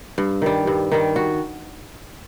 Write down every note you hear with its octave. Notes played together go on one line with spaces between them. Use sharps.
G2
D#3 G3
G2
D#3 G3
F#4